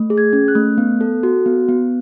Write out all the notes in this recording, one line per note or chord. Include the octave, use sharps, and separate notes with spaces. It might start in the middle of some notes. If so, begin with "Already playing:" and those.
Already playing: A3
G#4
G#6
C#4
F#6
A3
B3
A4
F#4
B3
B3